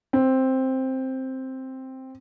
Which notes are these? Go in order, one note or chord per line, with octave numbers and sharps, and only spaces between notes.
C4